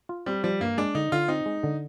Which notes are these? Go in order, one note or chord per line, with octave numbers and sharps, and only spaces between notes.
F4
G3 C4
F3 G3
G2 A#3
G#3 D4
D3 D#4
D3 F4
C4 D#4
G#3
D3